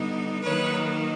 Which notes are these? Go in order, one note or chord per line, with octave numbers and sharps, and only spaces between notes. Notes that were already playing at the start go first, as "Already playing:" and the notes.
Already playing: D3 G3 B3 D#4
D#3 F#3 A#3 D#4 B4 C#5